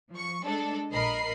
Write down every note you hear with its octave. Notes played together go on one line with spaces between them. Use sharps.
F3 C#6
G#3 D4 A4
A#1 A#4 D#5 B5 C7